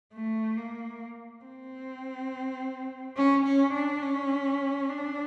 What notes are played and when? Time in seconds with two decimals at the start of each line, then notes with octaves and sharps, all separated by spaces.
0.14 A3
0.57 A#3
1.44 C4
3.17 C#4
3.46 C#4
3.73 D4
4.02 C#4
4.89 D4